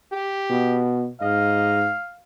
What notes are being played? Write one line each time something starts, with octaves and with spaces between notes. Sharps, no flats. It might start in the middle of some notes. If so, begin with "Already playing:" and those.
G4
B2
G#2 D#5 F5